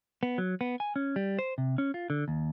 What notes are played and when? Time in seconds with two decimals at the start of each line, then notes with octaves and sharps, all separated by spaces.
0.23 B3
0.38 F#3
0.61 B3
0.80 G#5
0.96 C#4
1.16 G3
1.39 C5
1.58 C3
1.78 C#4
1.94 F4
2.10 D3
2.28 D#2